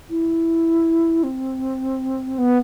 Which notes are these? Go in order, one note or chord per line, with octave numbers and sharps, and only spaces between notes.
E4
C4
B3